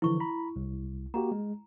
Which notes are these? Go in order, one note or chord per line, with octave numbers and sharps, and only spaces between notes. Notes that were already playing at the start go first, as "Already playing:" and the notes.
D3 E3 F3 E4 C#6
A#5 B5
C2
A#3 F#4 G4 A#5
G#3